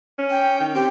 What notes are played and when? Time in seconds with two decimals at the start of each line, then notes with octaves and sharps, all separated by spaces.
0.19 C#4
0.30 G5
0.60 D#3
0.75 C4 G4